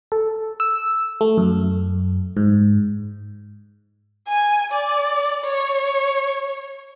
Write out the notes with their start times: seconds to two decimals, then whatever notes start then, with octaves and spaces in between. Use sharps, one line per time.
0.12 A4
0.60 E6
1.21 A3
1.38 F#2
2.37 G#2
4.29 G#5
4.72 D5
5.44 C#5